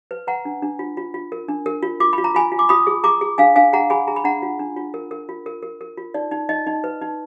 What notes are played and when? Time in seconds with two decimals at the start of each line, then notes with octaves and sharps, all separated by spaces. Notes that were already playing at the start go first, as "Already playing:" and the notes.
0.11 B4
0.27 B4 F#5 A#5
0.45 D4
0.62 D4
0.79 F4
0.97 F4
1.14 F4
1.32 A#4
1.48 D4
1.66 A#4
1.83 F4
2.00 F4 D6
2.13 B5
2.18 F4
2.24 A#5
2.34 F4 G#5 B5
2.52 F4
2.59 D6
2.69 F4 B5 D#6
2.87 G#4
3.04 G#4 A#5 D6
3.21 G#4
3.38 D4 F5 G#5
3.56 D4 F5 G#5
3.73 G#4 F#5 A#5
3.90 G#4 G#5 B5
4.07 G#4 A#5
4.16 B5
4.24 D4 F#5 A#5
4.42 F4
4.59 D4
4.77 F4
4.94 A#4
5.11 A#4
5.29 F4
5.46 A#4
5.63 A#4
5.81 A#4
5.97 F4
6.14 D#4 D5
6.31 D#4
6.49 D#4 D#5
6.66 D#4
6.84 B4
7.01 D#4